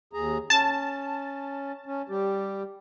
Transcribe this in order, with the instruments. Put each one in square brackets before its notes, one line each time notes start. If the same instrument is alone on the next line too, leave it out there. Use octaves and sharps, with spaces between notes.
[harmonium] D#2 G#4 A#5
[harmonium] C#4 [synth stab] A5
[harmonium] C#4
G3 G4